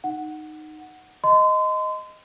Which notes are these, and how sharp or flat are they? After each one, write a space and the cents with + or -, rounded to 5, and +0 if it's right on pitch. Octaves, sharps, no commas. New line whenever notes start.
D#4 -10 F#5 +0
D#5 +0 C6 -35